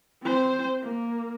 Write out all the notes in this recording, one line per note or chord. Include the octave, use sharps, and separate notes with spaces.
C4 C5
A#3